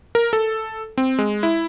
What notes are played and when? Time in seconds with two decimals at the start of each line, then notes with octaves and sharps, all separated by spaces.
0.15 A#4
0.33 A4
0.98 C4
1.19 G#3
1.43 E4